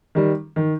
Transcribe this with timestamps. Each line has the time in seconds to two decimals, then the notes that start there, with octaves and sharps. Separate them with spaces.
0.15 D#3 G3
0.56 D#3